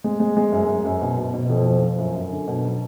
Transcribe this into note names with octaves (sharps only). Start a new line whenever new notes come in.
G#3
G#3
G#3
F#2
F#2
F#2
B2
B2
B2
F2
F3
F3
F#2
F#2
D3
B2
F#3